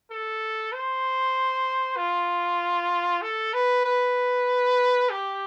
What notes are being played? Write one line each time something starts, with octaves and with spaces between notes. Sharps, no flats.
A4
C5
F4
A4
B4
B4
G4